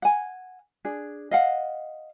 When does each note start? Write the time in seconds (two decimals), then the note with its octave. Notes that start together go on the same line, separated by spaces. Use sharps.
0.02 F#5 G#5
0.85 D4 G#4
1.31 D#5 F5 F#5